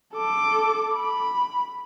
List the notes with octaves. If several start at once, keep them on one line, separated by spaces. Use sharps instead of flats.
A4 D6
B5